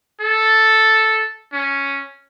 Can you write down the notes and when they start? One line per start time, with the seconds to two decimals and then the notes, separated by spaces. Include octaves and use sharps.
0.21 A4
1.53 C#4